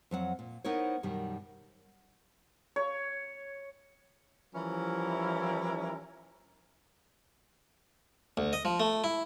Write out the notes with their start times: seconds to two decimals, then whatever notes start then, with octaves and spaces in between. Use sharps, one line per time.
0.11 F2 F#3 F#5
0.39 A#2
0.64 B3 D#4 E4 A#4 C5 C#5
1.03 F#2 B2 D#3 G3
2.76 C#5
4.55 E3 F3 G3 C#4 E4 A#4
8.37 D2
8.53 D#5
8.65 F3
8.80 A3
9.04 E4